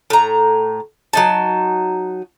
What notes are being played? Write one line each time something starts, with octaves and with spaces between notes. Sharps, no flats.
A2 A#5
F#3 D#4 A5